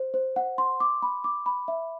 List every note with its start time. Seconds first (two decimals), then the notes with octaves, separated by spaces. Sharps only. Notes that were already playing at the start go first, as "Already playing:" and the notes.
Already playing: C5
0.14 C5
0.36 F#5
0.58 C6
0.80 D6
1.02 B5
1.24 D6
1.46 B5
1.68 E5